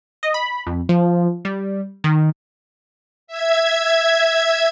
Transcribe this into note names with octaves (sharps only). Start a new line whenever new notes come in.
D#5
B5
F2
F3
G3
D#3
E5 G#6